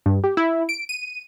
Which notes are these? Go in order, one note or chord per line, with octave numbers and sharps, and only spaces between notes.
G2
G4
E4
D7
D#7